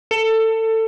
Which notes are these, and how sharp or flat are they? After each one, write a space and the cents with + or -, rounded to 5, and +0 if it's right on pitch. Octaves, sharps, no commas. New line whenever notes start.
A4 +20